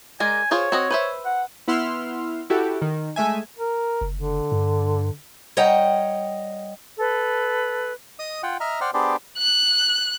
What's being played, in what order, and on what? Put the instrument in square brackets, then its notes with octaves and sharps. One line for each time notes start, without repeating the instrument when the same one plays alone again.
[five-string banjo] G#3 A#4 D5 [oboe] G#5
[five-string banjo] F4 G#4 C5 [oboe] C#5
[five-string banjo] C4 F#4 D#5
B4 C5 E5
[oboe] F#5
[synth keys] B3 E4 F#5 C6 E6 F6
E4 F#4 G4 A4
D#3
G#3 A3 E5 G#5
[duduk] A#4
[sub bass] F#1
[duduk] D3
[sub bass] G2
[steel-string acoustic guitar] G3 C#5 D#5 F#5 G5 A#5
[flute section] A4 B4
[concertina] D#5 D#6
F4 F#5 G5
D#5 E5 A#5 F6
C5 D5 F#5 G5 F6
B3 D4 G4 G#4 C5 D5
[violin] F#6